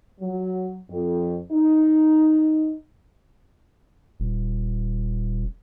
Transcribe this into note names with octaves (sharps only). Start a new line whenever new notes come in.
F#3
F2
D#4
D#1